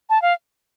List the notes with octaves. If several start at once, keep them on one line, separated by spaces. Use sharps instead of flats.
A5
F5